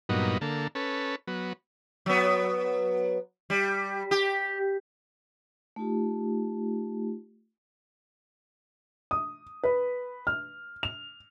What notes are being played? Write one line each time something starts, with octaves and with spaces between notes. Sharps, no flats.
G2 A#2 F#3 B3 D#4
D3 A#3 A4
C#4 A4 B4
F#3 B3
F#3 B3
G3
G4
A3 D#4 F4 G4
D#6
B4
F6
F7